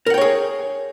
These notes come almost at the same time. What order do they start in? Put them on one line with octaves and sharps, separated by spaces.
A#4 F#5 G5 C#5 G#4